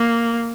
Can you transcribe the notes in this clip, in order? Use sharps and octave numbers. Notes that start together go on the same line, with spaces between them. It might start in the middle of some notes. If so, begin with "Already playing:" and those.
Already playing: A#3